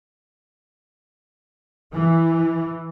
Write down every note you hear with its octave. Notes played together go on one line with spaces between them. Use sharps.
E3